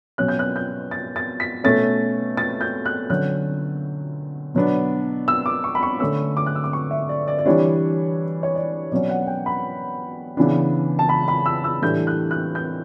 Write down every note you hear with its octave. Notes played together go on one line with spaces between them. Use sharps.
B2 F#3 C#4 F#6
G6
F#6
G6
A6
A6
B6
B2 A3 C#4 A6
A6
G6
F#6
D3 F#3 C#4 F#6
B2 F#3 B3 D4
E6
D6
C#6
B5
C#6
D3 A3 C#4 E6
D6
F#6
E6
D6
C#6
E5
D5
D5
D5
E3 G3 D4 C#5
C#5
D5
B2 F#3 C#4 D5
F#5
G5
B5
C#3 E3 B3 D4
A5
B5
B5
E6
E6
A2 E3 G3 D4 G6
F#6
F#6
G6